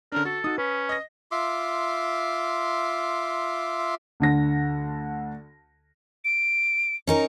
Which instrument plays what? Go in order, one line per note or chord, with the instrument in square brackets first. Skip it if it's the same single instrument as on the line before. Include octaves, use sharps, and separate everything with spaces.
[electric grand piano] D3 C#4 D4 [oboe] A#4
[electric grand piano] F#4 [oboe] A4
[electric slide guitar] D#4 F#4 [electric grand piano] D#6
[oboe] C#4 [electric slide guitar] B4
[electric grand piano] D#5 A#6
[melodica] F4 E5 C6 D6
[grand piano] D2 D3 A#6
[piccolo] D7
[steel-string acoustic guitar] C#4 D#4 A#4